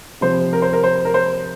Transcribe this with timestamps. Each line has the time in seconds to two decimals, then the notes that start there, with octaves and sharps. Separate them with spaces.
0.21 C3 F3 C5
0.53 A#4
0.62 C5
0.73 A#4
0.83 C5
1.05 A#4
1.14 C5